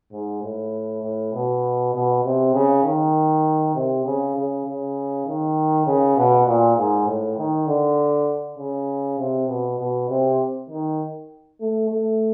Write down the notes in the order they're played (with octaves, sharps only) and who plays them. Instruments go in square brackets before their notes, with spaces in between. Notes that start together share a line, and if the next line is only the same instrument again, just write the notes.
[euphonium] G#2
A2
A2
B2
B2
C3
C#3
D#3
C3
C#3
C#3
C#3
D#3
C#3
B2
A#2
G#2
A2
D#3
D3
C#3
C3
B2
B2
C3
D#3
A3
A3